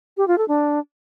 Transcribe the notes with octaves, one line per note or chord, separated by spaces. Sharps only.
G4
F4
A4
D4